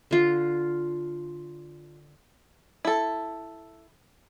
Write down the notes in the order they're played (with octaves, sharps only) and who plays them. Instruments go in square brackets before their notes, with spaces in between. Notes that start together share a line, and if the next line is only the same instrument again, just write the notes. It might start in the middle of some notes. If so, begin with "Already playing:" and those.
[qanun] D3 F4
[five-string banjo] E4 A4